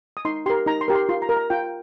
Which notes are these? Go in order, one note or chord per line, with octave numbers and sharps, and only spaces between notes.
D#6
D#4 C6
G4 A#4 C6
D#4 A#5
C6
G4 A#4
C6
F4 C6
A#5
A#4
A#5
F4 G5